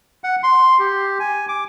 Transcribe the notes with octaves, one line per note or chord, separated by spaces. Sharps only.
F#5
C6
G4
G#5
D6